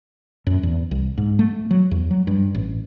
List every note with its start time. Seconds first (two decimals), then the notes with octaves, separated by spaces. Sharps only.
0.47 F#2
0.63 E2
0.91 C2
1.18 G#2
1.39 A3
1.71 F#3
1.91 E2
2.11 F#3
2.27 G2
2.55 A1